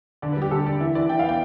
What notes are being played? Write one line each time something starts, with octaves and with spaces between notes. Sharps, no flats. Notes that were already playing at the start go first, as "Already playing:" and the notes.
D3 D5
B4
G3
G4
D3 A4
D3 D5
E3 E5
E3 D5
E3 G5
F5
B3
G5